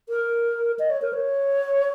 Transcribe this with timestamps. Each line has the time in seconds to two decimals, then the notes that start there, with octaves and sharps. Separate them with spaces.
0.09 A#4
0.79 D#5
0.90 C#5
1.02 A#4
1.13 C#5